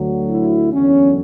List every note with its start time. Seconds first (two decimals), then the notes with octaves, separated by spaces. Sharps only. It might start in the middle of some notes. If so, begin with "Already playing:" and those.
Already playing: D2 D3 F#3
0.28 E4
0.72 F#1 E2 D3 F#3 C#4